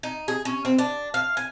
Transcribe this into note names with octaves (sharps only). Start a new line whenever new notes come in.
D#4
G#4
C#4
C4
D4
F5
G#5